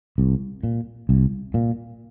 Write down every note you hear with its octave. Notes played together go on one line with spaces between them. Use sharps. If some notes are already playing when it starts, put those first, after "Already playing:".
C2
A#2
C2
A#2